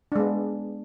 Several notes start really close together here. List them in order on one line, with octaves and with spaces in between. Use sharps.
D4 G#3 B3